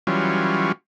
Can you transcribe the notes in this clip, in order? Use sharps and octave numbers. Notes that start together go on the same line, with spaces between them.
E3 F#3 G3 C#4 F4